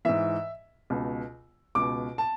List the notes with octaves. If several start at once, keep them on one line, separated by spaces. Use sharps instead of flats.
G#2 E3 E5
C#2 B2
C#2 B2 D6
A5